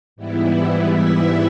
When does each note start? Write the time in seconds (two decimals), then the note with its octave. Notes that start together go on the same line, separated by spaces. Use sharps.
0.16 G#2 E3 G3 B3 E4
0.92 E5